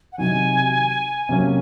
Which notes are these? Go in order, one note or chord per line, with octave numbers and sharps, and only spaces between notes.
F#5
C3 D#3 F#3 G#5
C3 F#3 A#3 C#4